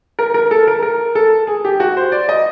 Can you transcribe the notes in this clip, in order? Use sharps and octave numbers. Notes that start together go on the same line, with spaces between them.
A#4
A#4
A4
A#4
A#4
A4
G#4
G4
F#4
C5
D5
D#5